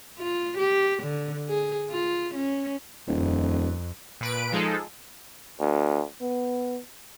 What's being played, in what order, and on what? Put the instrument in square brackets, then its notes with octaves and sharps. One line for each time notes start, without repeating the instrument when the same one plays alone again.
[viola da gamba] F4
G4
D3
G#4
F4
C#4
[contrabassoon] D#1 [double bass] F2
[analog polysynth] A#2 B4 D7
F3 G#3 D#4 G#4 A4
[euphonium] D2
B3